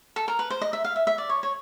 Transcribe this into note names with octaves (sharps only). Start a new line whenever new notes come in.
A4
A#4
B4
C5
D#5
E5
F5
E5
E5
D5
C#5
C#5